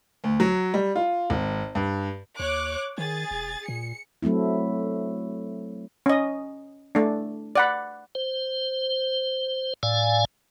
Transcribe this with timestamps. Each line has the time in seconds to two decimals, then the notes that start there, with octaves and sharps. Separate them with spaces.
0.24 D2
0.40 F#3
0.74 G3
0.96 F4
1.30 G#1
1.75 G2
2.40 D#2 C#5 D6 F#6
2.98 D#3 G#4 A6
3.31 E1
3.68 A#2 C#7
4.23 F#3 A3 C4 E4
6.06 C#4 D#5
6.95 A3 D4
7.56 D5 F#5 B5
8.15 C5
9.83 A2 D5 F5 G#5